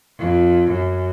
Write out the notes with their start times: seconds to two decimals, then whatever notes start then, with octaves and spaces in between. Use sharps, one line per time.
0.19 F2
0.71 F#2